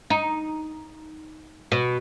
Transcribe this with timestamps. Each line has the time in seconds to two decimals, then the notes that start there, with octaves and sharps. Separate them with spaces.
0.10 D#4
1.72 B2